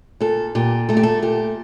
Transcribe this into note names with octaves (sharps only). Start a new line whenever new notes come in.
A#2 A4
A#2 G4
A3 A4
G4
A4
A#2 G4